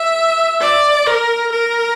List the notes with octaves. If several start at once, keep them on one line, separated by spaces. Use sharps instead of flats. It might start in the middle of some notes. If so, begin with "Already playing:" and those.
Already playing: E5
D5
A#4
A#4